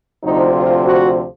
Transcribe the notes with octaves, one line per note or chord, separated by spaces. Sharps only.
D2 C3 F3 D#4
F4
F#4